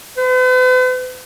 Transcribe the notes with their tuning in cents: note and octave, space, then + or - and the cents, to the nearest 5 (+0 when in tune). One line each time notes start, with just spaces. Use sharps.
B4 +45